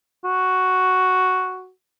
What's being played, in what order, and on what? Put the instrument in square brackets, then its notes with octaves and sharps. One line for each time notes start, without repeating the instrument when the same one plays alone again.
[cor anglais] F#4